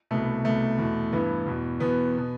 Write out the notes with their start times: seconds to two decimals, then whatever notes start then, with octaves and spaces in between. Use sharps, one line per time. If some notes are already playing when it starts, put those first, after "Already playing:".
0.11 C2 B2 A3
0.44 C2 B2 A3
0.79 E2 B2
1.12 G2 E3 B3
1.47 E2 B2
1.80 E2 B2 B3
2.18 B2